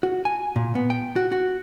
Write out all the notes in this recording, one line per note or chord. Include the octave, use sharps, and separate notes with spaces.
F#4
G#5
A#2
B3
G5
F#4
F#4